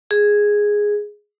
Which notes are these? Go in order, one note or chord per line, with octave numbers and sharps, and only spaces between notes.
G#4